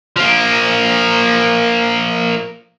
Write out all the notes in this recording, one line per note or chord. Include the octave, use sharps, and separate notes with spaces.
F3 A#3